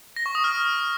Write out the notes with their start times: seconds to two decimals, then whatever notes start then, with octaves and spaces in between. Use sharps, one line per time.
0.16 A#6
0.26 C#6
0.35 D#6
0.44 F6